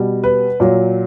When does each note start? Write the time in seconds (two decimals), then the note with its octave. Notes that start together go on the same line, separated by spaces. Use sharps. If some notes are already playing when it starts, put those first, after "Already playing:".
Already playing: B2 G3
0.24 B4
0.60 A#2 F#3